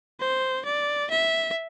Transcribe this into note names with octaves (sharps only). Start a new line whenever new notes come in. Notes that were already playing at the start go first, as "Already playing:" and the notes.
C5
D5
E5